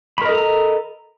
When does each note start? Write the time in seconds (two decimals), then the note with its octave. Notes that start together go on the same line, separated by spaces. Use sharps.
0.18 B5
0.22 A#4
0.25 D#5
0.29 A4
0.33 A#5